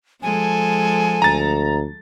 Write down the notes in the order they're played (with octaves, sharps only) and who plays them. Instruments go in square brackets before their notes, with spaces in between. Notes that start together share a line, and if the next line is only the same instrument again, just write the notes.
[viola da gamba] F3 G#3 A4 [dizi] G#5
[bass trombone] D2 [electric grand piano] A#5 A6